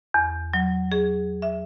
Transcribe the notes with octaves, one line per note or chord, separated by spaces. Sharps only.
E2
F#3
G#4
E5